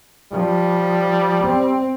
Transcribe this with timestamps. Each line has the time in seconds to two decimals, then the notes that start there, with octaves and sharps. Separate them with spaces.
0.32 F3 G3
1.44 C4